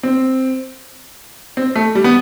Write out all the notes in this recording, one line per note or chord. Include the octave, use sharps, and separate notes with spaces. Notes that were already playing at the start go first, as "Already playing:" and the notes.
C4
C4
A3
G3
B3